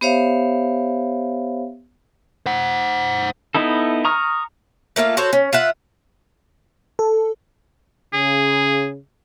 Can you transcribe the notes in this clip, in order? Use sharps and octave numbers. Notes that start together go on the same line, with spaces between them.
B3 G4 C5 C#5 E5 F5
C5 F#5
B3 D#4 E4 A4
A#5 C#6 D#6 F6
A3 A#3 F4 F5
F#4 A4 C5 C#5
C#4
F4 E5 F#5
A4
C#3 G#4